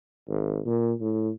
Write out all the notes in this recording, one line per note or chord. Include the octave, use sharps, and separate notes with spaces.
G#1
A#2
A2